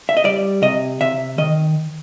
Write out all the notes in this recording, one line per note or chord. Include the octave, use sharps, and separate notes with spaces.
E5
D#5
G3 D5
C3 D#5
C3 E5
D#3 D#5